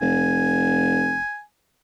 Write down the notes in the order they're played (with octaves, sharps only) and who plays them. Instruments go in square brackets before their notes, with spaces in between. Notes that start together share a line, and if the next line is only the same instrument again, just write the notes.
[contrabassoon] F1 [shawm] G#5